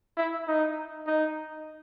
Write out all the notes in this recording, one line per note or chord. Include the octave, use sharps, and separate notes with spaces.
E4
D#4
D#4